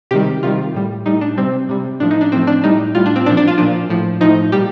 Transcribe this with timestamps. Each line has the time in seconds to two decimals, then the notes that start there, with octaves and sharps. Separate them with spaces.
0.11 C3 D#3 G3 G4
0.43 C3 D#3 G3 F4
0.74 A2 G3
1.05 A2 G3 D#4
1.21 D4
1.37 C3 G3 C4
1.69 C3 G3
2.00 A2 F3 D4
2.11 D#4
2.21 D4
2.32 A2 F3 C4
2.47 D4
2.64 A2 G3 D#4
2.95 A2 G3 F4
3.06 D4
3.16 C4
3.26 A#2 F3 D4
3.37 D4
3.47 F4
3.58 A#2 F3 D4
3.89 A2 F3
4.21 A2 F3 D#4
4.52 A#2 G3 G4